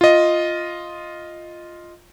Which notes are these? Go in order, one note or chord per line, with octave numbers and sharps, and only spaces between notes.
F4 D#5